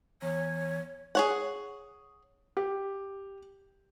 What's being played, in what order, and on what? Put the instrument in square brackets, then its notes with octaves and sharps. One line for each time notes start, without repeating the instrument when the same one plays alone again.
[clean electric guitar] E2 [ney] C#5
[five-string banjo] G#4 C#5 F#5
[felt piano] G4